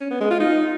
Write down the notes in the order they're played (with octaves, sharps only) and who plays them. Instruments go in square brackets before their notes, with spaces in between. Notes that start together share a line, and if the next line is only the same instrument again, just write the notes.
[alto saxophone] C#4
B3
G#3
F4
D#4